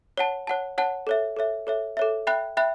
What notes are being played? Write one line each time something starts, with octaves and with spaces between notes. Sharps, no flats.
C#5 F#5 A5
C#5 F#5 A5
C#5 F#5 A5
A4 C#5 E5
A4 C#5 E5
A4 C#5 E5
A4 C#5 E5
E5 G5 B5 F#6
E5 G5 B5 F#6